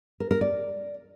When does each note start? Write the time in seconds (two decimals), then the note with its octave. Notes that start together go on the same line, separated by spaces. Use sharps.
0.20 A#4
0.31 A#4
0.41 D5